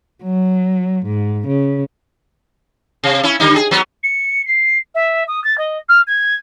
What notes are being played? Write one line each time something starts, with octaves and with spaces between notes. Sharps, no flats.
F#3
G#2
C#3
C3
C#4 E4
D3 G3 D#4
G#4
F#3 B3
C#7
C7
E5
D#6
A6
D#5
F6
G#6